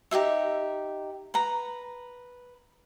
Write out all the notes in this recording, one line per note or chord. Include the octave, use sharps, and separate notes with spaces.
D#4 G4 G#4 E5
B4 A#5